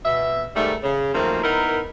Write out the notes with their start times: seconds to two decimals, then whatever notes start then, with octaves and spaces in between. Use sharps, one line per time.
0.05 B2 E5
0.56 G#2 D#3 G3 A3
0.83 C#3
1.14 D#3 F3 F#3 A3 A#3 C4
1.44 B3 D#4 E4 A#4